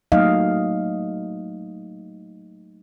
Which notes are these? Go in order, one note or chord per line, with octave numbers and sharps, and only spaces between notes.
F#3 A3 A#3 D#4 D#5 F5